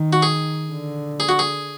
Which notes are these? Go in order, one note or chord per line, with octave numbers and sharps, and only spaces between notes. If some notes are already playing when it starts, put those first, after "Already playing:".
Already playing: D#3
F#4
G#4
D3
G#4
F#4
G#4